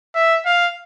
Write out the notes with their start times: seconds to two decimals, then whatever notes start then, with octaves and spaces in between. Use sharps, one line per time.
0.15 E5
0.46 F5